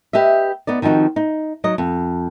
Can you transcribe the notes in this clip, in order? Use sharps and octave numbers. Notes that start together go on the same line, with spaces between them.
G4 B4 D#5 E5
B3 D#4 D5
D#3 F3 C4 D#4 F#4
D#4
F#3 D#4 D#5
F2